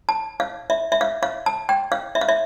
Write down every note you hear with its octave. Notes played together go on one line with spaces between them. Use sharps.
A5
F5
E5
E5
F5
F5
A5
G5
F5
E5
F5
E5